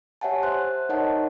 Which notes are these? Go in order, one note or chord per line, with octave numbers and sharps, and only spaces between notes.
G4 C#5 E5 F#5 G#5 A5
C5 E5 C6 F#6
D#4 A#4 C#5 D#5 F#5 A5